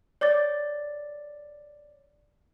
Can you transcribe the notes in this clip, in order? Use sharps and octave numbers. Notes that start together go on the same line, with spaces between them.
C#5 D5 D6 A6